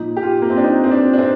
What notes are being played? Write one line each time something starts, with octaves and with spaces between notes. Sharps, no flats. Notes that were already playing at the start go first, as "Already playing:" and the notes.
Already playing: A#2 F3 D#4
G4
F4
A#3
C4
D4
D#4
C4
D4
D4
C4